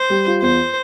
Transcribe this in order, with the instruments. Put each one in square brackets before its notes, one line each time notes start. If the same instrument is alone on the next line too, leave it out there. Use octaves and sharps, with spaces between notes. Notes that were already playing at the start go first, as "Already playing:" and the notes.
Already playing: [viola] C5
[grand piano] G3
F4
[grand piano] E2 [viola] C5